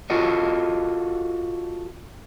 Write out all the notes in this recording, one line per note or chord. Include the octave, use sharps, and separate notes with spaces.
F4 F#4 A4 C#5 D#5